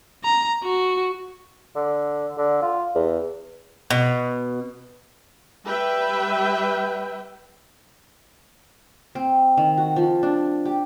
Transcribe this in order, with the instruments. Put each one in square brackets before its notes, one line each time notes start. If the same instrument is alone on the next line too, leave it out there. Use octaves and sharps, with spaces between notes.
[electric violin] A#5
F#4
[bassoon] D3
D3
F4
E2
[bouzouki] B2
[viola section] G3 B4 E5 G5
[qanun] C4
D#3
F#4
F3
D4
G4